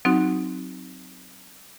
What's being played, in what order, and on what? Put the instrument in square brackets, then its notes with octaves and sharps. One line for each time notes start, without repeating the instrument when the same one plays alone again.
[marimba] F#3 C4 D#4 F#4